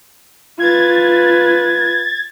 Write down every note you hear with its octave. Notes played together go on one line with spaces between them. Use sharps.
F4 B4 G#6 A6